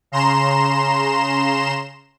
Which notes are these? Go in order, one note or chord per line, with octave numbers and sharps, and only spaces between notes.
C#3 A#5 C6 E7